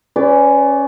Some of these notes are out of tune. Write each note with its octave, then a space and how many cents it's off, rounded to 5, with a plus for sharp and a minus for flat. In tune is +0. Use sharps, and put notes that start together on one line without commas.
C#4 +0 B4 +35 D5 -15